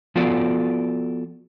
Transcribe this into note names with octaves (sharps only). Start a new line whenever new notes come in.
F3 B3 F4 F#4 A4 D5